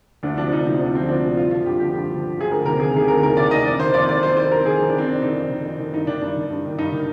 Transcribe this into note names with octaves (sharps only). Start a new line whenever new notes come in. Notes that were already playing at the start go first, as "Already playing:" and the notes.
D2 D4
C3 F3 D4
D2 D#4
C3 F3 D#4
D2 D4
C3 F3 C4
D2 D4
C3 F3
G2 F4
D3 F3 F4
G2 G4
D3 F3 G4
G2
D3 F3
G2
D3 F3 G#4
D2 A#4
C3 D#3 A#4
D2 G#4
C3 D#3 G#4
D2 A#4
C3 D#3 A#4
D2 D5
C3 D#3 D#5
F2 D5
D#3 C5
F2 D5
D#3 D5
F2 C5
D#3 C5
F2 A#4
D#3 G#4
F2
D4
D#3 C4
F2 D4
D#3 D#4
F2
D#3
F2
D#3
G2 D#4
D#3 D4
G2 D4
D#3
G2
D#3
G2 D#4
D#3